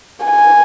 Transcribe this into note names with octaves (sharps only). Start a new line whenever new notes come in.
G#5